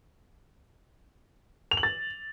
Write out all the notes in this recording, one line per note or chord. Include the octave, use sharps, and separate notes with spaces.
F7
F#7
A6